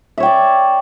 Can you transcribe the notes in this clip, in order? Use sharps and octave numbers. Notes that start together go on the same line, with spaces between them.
C#5 D5 E5 G5